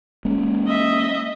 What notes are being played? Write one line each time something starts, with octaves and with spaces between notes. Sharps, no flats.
G#3 A#3 C#4
D#5 E5